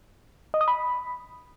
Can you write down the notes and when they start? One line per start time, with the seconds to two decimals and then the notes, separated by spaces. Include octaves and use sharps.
0.54 D#5
0.61 D#6
0.68 B5